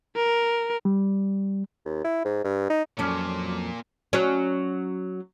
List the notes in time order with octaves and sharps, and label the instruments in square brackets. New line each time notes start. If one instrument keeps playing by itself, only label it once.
[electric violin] A#4
[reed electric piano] G3
[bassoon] D#2
E4
G#2
G2
D#4
[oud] F2 C#4 [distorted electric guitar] A#2 [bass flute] F#3 [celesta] A5 D6 F6
[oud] F#3 C#4